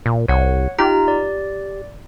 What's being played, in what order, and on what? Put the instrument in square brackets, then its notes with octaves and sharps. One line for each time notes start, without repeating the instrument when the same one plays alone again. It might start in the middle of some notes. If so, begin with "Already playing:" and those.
[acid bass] A#2
[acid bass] C2 [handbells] C#5 F#5
[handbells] D#4 F4 A#5 [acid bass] G4
[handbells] D5